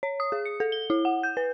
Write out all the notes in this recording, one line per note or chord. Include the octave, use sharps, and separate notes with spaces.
C#5
D#6
G#4
C#7
A4
G7
E4
F#5
G6
B4